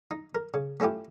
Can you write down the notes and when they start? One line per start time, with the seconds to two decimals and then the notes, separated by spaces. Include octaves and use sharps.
0.11 D#4
0.35 A#4
0.54 C#3
0.80 A3 C#4 E4 F4 G4